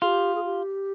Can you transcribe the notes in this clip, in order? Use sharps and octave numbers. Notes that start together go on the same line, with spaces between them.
F4 G4 G#4
G#4
G4